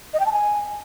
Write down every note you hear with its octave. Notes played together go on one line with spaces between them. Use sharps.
D#5
G5
A5
G#5